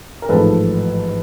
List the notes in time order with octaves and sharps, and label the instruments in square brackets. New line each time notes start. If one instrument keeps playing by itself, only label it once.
[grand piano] A#4
A1 G#2 F3 A4 B4